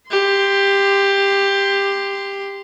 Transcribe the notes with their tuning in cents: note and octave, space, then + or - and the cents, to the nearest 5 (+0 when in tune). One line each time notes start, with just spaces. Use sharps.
G4 +15 C6 -15